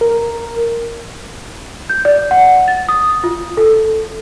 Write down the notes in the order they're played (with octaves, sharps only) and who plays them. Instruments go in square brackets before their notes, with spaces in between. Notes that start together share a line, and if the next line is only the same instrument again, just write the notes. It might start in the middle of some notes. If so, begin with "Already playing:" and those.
[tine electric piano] A#4
[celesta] G6
D5
F#5
A6
D#6
F4
A4